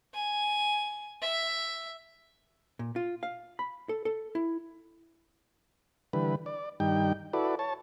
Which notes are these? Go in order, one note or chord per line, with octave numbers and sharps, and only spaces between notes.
G#5
E5
A#2
F4
F5
B5
A4
A4
E4
D3 E3 G3 B4
D5
G2 D#3 G3 D#4 G5
E4 F#4 A4 B4 D5
C#5 A5